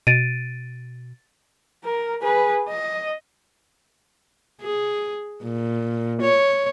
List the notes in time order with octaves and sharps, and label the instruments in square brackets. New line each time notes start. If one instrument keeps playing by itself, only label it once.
[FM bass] B2 [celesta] A6 D7 D#7
[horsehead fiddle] A#4
G#4 B4
D#5
[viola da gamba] G#4
A#2
C#5